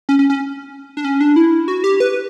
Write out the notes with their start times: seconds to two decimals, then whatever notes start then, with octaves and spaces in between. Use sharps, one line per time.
0.09 C#4
0.19 C#4
0.30 C#4
0.97 D4
1.04 C#4
1.21 D4
1.36 E4
1.68 F#4
1.84 G4
2.00 B4